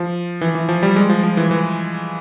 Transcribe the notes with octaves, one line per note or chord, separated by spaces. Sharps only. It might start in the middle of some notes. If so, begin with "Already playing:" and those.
Already playing: F3
E3
E3
F3
G3
G#3
F3
F3
E3
E3